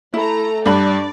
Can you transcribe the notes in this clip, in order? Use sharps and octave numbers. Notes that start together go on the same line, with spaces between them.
A3 E4 A#5
G2 D4 D5 B5